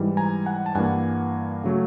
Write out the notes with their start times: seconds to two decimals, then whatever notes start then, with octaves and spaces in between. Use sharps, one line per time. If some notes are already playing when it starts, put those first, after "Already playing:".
Already playing: G#2 E3 G3
0.17 G#5 A#5
0.46 F#5 G#5
0.66 A5
0.75 G2 E3 G3 A#3 F#5 G#5
1.64 C#3 F#3 A3